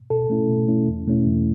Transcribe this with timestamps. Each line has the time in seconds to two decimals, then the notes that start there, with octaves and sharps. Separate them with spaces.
0.10 B2 A4
0.30 A3 C#4 E4
0.49 B2
0.68 A3 C#4 E4
0.88 E2
1.07 B2 A3 C#4 E4
1.27 E2